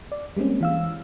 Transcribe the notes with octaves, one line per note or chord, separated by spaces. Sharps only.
D5
G3 G#3 A#3 C4 C#4
E3 F5 E6